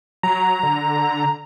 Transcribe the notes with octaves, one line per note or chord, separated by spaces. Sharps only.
F#3 A#5
D3